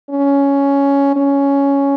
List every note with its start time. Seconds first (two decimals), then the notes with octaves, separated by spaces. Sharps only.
0.10 C#4
1.16 C#4